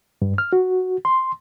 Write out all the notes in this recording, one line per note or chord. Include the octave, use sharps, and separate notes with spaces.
G2
F6
F#4
C6